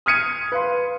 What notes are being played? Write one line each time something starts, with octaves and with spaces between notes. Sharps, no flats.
D#6 F6 G#6 C#7 D#7
B4 F5 C6